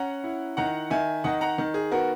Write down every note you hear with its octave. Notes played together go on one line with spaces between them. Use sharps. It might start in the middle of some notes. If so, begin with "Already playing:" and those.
Already playing: C#4 F#5 A#5
E4
D#3 F#5 A#5
D#3 E5 G#5
D#3 D#5 F#5
F#5 A#5
D#3
G#4
B3 F#4 A#4